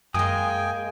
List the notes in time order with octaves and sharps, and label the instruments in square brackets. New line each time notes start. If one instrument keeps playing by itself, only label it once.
[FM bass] F#2 [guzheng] G#3 A#3 [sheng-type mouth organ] G5 G#5 [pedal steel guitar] D#6